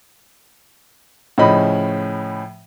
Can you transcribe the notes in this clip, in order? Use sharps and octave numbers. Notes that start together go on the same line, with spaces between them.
A2 C#3 F3 C#4 D#5 B5